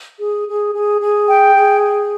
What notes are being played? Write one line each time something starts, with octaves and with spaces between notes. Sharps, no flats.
G#4
G#4
G#4
G#4
G5
G#4